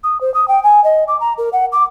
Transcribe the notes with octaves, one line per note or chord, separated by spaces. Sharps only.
D#6
C5
D#6
G5
G#5
D#5
D6
A#5
A#4
F#5
D6